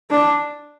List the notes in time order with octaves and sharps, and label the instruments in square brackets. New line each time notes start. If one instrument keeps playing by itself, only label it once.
[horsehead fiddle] D4